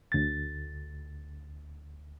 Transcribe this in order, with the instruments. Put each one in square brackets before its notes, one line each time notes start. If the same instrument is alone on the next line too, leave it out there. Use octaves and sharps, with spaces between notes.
[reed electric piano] D2 A6